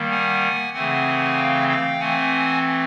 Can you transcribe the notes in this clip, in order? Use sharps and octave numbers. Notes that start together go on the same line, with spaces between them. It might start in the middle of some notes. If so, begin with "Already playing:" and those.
Already playing: D#3 G3 A#3
F#5 G#5
C#3 E3 A3 C4 F#5 G#5
F5 G5
F5 G5
E3 A3 C4 F#5 G#5